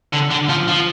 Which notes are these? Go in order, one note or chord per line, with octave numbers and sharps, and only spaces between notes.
D3
D3
F3
F3